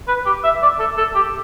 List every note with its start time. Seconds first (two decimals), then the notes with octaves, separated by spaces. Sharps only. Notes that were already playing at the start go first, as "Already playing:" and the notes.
0.08 B4
0.26 G4
0.44 E5
0.62 D5
0.79 A4
0.98 A4
1.15 G4